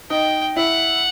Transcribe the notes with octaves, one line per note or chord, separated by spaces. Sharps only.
D#4 G5
E4 F#5